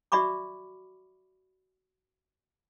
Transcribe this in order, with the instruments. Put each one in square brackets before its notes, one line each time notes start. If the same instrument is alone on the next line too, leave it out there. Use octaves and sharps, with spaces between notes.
[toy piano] F#4 D5 E5 B5 C#6 D6